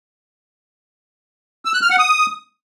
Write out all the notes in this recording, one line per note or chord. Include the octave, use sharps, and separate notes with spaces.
E6
F#6
F6
F#5
D#6